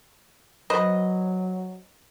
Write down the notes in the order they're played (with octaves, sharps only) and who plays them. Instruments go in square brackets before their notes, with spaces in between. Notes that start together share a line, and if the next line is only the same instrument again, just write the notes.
[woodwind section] F#3 [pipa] B4 C5 D#5